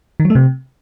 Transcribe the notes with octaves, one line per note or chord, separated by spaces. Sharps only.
D#3
F#3
A3
C3